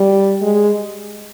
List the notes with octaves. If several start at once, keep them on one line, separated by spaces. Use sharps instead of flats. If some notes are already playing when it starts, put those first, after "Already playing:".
Already playing: G3
G#3